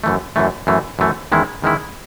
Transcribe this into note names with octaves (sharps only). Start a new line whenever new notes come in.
F#2 E3 A3
F#2 E3 A3
F#2 E3 A3
F#2 E3 A3
E2 D#3 G#3 C#4 E4
E2 D#3 G#3 C#4 E4